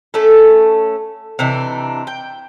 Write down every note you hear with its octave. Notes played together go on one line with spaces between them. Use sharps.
A3 C#4 A4
C3 E3 D4 D#4
G5